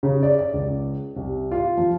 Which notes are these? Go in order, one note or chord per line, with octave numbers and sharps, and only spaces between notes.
C#3
D5
D5
C#2
C2
F4
F3